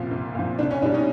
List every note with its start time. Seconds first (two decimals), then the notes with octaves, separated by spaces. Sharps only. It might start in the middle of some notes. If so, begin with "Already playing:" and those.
Already playing: C2 A#2 F3
0.11 C2
0.35 A#2 F3
0.59 C2 D4
0.71 C#4
0.82 B2 D4
0.85 G3
0.94 C#4 D#4